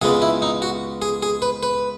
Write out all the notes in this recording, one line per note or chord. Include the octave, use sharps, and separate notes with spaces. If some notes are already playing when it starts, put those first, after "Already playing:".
C#2 C#3 G#3 B3 G#4
E4
D#4
F#4
G#4
G#4
B4
B4